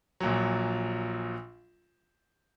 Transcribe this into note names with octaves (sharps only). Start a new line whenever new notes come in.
A#1 A#2 F#3